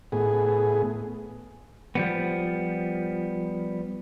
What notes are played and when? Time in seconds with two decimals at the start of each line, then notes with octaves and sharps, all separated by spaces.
0.12 A2 B3 G#4
1.95 F3 G3 B3